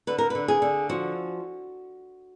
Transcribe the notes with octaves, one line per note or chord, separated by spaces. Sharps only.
D3 B4
A#4
D3 B4
G#4
D3
F3 F#4